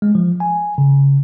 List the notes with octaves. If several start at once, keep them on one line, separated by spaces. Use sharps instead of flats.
G#3
F3
G#5
C#3